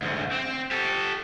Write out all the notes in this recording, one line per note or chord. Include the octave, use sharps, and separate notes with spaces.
D2 G#2
C4
G4 A4